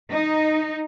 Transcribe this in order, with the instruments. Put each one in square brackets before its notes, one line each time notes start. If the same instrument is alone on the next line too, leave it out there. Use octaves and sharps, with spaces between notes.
[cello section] D#4